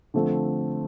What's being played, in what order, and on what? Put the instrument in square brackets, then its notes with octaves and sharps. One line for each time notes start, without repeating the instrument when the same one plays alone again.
[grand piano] D3 F3 A3 C4